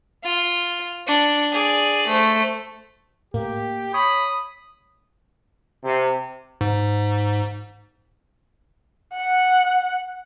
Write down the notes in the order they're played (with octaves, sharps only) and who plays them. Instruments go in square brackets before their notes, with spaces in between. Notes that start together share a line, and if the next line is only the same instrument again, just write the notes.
[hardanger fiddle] F4
D4
G#4 D5
A3 C5
[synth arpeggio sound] A2 [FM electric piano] A#3 [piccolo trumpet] G4
[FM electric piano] C#5 [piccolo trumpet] B5 [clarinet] D#6
[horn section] C3
[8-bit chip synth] G#2
[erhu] F#5